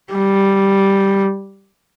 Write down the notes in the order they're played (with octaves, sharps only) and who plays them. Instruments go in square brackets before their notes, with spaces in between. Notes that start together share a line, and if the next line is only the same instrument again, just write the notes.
[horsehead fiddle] G3